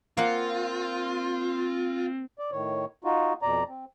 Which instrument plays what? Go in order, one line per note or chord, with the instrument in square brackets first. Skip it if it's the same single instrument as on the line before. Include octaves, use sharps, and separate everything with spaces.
[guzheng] A#3 F#5 [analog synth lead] C4 [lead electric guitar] F4
[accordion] D5
A2 D#3 C#5
D#4 F4 F#4
F2 B2 D5 A#5
C4